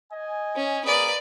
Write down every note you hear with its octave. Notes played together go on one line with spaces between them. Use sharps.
D#5 G#5
C#4
A#3 G#4 B4 D5